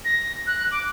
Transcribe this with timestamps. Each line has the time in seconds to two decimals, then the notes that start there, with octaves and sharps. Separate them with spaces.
0.04 A#6
0.46 F#6
0.71 D6